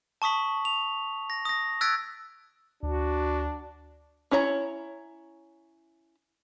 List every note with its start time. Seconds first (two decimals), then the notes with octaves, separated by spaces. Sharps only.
0.22 A5 C#6 D#6 B6 F#7
0.65 F7
1.30 A#6
1.45 D#6 A#6
1.81 E6 F#6 G#6 A6 B6 D7
2.83 D2 D4 F#4
4.31 C#4 E4 C#5 F5 A#5